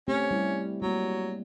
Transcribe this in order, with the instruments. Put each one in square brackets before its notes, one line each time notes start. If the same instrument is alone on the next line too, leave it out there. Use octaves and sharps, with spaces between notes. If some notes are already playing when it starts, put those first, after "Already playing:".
[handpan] A3 C4 G4 [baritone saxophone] C#4
[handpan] G3 E4
[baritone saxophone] F#3 [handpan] G3 A#3